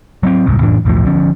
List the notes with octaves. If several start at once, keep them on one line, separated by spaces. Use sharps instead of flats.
F#3 B3 C4
D#1 C2 G#2
F2 A2 E3 D4
B1 E2 A2 F3
D3 F3 C#4